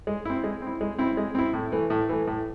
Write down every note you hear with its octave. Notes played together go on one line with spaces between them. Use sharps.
G#3
C4 E4
G#3
C4 E4
G#3
C4 E4
G#3
C4 E4
A2
E3 A3
A2
E3 A3
A2